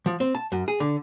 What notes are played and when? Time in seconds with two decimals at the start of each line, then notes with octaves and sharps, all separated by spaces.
0.06 F3
0.20 C4
0.35 A5
0.52 F#2
0.68 G#4
0.80 D3